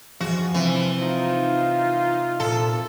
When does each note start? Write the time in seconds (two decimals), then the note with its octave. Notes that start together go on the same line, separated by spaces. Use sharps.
0.20 E2 F3 F#4 G#4 D#5
0.54 C3 E3 C4 C5
1.02 D#4 F4
2.40 A#2 A4